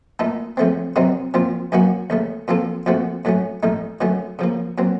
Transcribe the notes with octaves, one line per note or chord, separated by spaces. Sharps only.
A#2 A3 D#4 A4
F2 C#3 A3 C4
C3 D#3 F#3 C4 D#4
A#2 F3 C4 F4
F#2 D#3 A#3 C#4 F#4
D#2 C#3 A3
A#2 F3 C4 F4 A4
A#2 F3 A3 C4 F#4
A2 F#3 A3 C#4
A1 A2 A3 D#4
D#3 F#3 A3 C#4
C#3 F3 A#3
A#2 F#3 C4